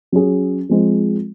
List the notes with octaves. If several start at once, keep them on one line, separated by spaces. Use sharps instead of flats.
F#3 C#4 G#4
F3 G#3 C4